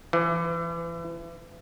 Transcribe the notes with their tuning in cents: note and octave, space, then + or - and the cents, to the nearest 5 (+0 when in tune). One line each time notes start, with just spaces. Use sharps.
E3 +30